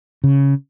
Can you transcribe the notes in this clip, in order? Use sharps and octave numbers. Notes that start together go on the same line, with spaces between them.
C#3